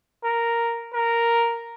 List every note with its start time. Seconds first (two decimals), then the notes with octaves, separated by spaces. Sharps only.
0.24 A#4
0.93 A#4